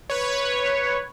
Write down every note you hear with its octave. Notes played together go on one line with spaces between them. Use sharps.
B4 C#5